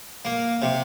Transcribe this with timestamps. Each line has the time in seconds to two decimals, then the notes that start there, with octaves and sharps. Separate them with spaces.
0.25 A#3
0.62 C3